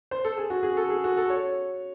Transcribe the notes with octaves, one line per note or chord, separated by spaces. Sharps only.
C5
A4
G#4
F#4
G#4
A4
G#4
F#4
A4
C#5